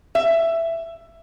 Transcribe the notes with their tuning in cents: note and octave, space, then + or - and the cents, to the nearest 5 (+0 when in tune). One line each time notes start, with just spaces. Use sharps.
E5 +10